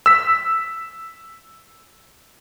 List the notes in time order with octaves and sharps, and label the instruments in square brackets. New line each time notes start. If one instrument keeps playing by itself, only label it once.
[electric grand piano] E6 B6